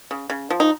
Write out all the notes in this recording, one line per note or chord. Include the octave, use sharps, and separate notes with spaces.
C#3
C#3
F3
D#4